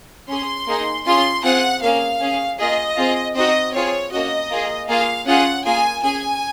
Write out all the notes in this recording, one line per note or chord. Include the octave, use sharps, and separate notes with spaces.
C#4 G#4 C6
A#3 D#4 G#4
C#4 F4 G#4 C6
C4 F4 G#4 F#5
A#3 C#4 G#4 F5
C#4 G#4
A#3 F4 G#4 D#5
C4 F4 G#4
C4 D#4 F#4 D#5
C4 F4 G#4 C#5
A#3 C#4 F#4 D#5
A#3 F4 G#4
A#3 F4 G#4 F5
C#4 F4 G#4 F#5
A#3 F4 G#4 G#5
C#4 G#4 G#5